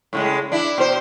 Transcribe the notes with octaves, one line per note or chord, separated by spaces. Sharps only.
A2 C#3 G#3
D4 E4
B2 C5